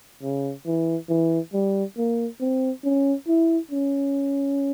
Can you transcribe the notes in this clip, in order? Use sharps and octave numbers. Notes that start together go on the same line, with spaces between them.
C#3
E3
E3
G3
A#3
C4
C#4
E4
C#4